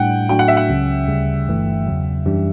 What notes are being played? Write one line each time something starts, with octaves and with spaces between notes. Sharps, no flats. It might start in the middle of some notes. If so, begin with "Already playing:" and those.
Already playing: A2 G3 D4 F#5 G5
A2 F#3 A3 D4 F#4 G5
F#5
E5
F#5
C#2 C#3 F#3 C#4
D2 C#3 G3
G1 G2 E3 A3
E2 C#3 F#3
F#2 E3 G3 D4 G4